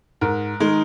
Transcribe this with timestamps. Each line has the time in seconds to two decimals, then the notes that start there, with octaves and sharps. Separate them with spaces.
0.21 G#2 A#4
0.60 D#3 G#3 D#4